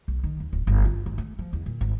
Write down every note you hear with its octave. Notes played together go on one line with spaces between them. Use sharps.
B1
D#3
D#2
D1
G1
F4
G#1
A3
F3
E2
A#2
G#1